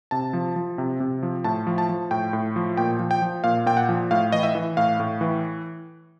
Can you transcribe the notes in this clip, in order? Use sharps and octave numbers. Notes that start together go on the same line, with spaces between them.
C3 A5
F3
F3
C3
C3
F3
A2 A5
F3
A5
F3
A2 G5
A2
F3
A#2 G5
F3
G5
F3
A#2 F5
A#2 G5
F#5
F3
A2 F5
E3 D#5
E5
E3
A2 F5
A2
E3